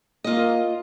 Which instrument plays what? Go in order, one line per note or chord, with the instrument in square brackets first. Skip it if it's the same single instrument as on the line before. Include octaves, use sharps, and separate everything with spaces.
[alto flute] A#3 [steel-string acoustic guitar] F4 D#5